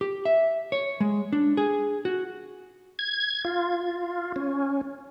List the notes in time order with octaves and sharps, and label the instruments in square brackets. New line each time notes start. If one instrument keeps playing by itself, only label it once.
[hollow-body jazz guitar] G4
E5
C#5
G#3
D4
G#4
F#4
[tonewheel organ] G#6
F4
C#4